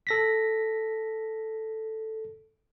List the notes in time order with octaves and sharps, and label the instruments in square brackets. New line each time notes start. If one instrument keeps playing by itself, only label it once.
[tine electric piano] A4 A#6 B6